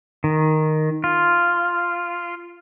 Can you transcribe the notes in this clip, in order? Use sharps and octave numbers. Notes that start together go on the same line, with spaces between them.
D#3
F4